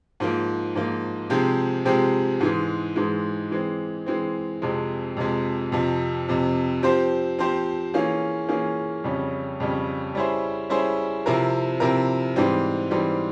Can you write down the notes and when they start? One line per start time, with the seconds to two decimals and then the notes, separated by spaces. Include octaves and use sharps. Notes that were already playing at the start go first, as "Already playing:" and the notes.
0.20 G#2 F3 A#3
0.75 G#2 F3 A#3
1.30 C3 F3 G#3 C4 G4
1.85 C3 F3 G#3 C4 G4
2.40 G#2 E3 G#3
2.96 G#2 E3 G#3
3.51 E3 G#3 C4
4.06 E3 G#3 C4
4.62 F2 C3 F3 G#3
5.17 F2 C3 F3 G#3
5.72 F2 C3 F3
6.28 F2 C3 F3
6.83 F3 C4 G4 C5
7.39 F3 C4 G4 C5
7.94 E3 A#3 C#4 F4 G#4
8.48 E3 A#3 C#4 F4 G#4
9.04 F2 C#3 G3 C#4
9.60 F2 C#3 G3 C#4
10.15 G3 C#4 E4 G#4 C5
10.70 G3 C#4 E4 G#4 C5
11.26 C3 F3 C4 E4 A#4
11.80 C3 F3 C4 E4 A#4
12.36 G#2 E3 G3 C4
12.91 G#2 E3 G3 C4